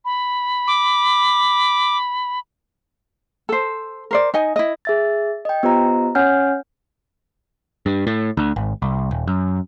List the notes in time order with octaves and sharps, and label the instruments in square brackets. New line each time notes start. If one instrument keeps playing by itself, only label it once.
[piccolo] B5
[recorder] D6
[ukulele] A4 C5
A#4 C5 D5
D#4 D#5 G#5
E4 D#5
[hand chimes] G#4 E5 A6
D#5 G5
B3 F4 G4 C5 D#5 A#5
C#4 C#5 F#5 G#5 F6 G6
[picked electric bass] G2
A2
D2
G#1
C2
D#1
F#2